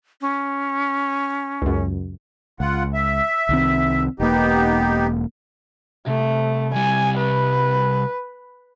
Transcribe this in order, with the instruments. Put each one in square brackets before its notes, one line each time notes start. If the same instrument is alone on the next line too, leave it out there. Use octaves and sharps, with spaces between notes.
[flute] C#4
[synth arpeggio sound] C#2 F#2
[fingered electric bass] C#2 [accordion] F4 F#5
[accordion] E5
[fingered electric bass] C2 D#3 C4
[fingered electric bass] E1 A#3 [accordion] B3 D#4 G4
[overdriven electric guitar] C2 [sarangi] A3
[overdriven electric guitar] C2 G3 [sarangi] G#5
[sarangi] B4